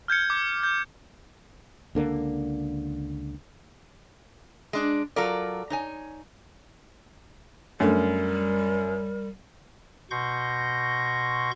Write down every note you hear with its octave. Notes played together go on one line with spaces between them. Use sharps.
F6 G6 G#6 C#7
D6
G6
C#2 D3 A#3 D4
G#3 D4
F#3 F4 A4 A#4 D5
D#4 C#5 G#5
F#2 G3 A3 D4 A4 A#4
B2 C6 C#6 G6 A#6